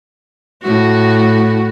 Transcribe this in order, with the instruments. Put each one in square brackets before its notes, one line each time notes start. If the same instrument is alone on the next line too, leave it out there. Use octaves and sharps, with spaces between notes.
[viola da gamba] A2 F#4